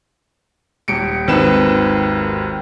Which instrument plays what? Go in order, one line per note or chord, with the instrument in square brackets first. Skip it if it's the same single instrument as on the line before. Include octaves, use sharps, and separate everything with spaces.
[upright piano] D#1 C#7 D7
G#1 D#2 C4 B4 E7